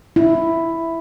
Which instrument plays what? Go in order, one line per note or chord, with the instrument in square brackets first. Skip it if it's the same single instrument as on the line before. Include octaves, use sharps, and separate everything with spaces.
[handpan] E4